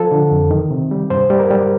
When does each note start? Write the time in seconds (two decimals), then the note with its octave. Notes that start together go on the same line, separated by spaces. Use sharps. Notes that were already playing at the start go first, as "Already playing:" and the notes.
Already playing: F3 A4
0.11 D3
0.31 F2
0.51 D#3
0.71 C3
0.91 G3
1.10 G2 C5
1.30 G3
1.40 A#4
1.50 G3